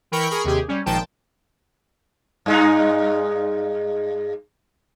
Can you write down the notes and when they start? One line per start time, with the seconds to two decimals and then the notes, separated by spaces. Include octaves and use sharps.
0.12 E3 A#4 G5 B5 C#6 C#7
0.30 G#4 A#4 B5 C#6
0.44 D#2 C3 G4 G#4
0.68 G3 C#4
0.86 G#1 A#2 D#3 F3 G5 A5
2.46 G2 G#3 D#4